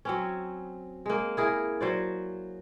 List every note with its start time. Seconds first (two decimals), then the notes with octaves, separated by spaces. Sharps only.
0.05 F#3 C4 C#4
1.06 G#3 A#3
1.37 E4 G#4 A#4
1.81 F#3 C5 D5